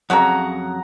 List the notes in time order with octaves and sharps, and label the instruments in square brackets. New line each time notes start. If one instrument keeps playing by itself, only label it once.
[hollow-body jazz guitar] F2 C#3 F#3 [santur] F#5 A#5